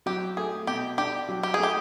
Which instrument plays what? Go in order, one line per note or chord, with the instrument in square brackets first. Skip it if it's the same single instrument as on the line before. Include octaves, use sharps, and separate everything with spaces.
[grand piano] F#3 [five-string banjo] G4
[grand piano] A3 [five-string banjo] G#4
[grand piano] B2 [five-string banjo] G4
[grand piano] D4 [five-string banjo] G4
[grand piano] F#3
[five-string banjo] G4
[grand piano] A3 [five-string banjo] G#4
[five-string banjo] G4